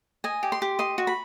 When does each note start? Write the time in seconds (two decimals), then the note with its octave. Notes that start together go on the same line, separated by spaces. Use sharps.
0.24 D#5 G#5
0.43 G4
0.52 C6
0.62 G4
0.79 D#5 C6
0.98 F#4
1.07 B5